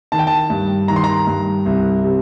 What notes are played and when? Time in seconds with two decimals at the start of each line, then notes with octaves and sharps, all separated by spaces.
0.12 D#3 A5
0.19 G5
0.27 A5
0.50 G2
0.88 D#3 A#5
0.96 C6
1.04 A#5
1.27 G2
1.66 C2
2.04 C3